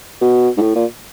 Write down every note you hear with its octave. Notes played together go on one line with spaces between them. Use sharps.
B2
G#2
A2
A#2